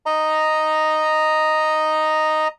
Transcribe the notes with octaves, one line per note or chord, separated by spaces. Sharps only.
D#5 A#5